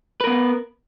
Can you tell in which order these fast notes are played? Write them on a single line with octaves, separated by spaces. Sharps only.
B4 A#4 B3